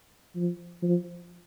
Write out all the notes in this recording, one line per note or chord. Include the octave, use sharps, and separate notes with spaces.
F3
F3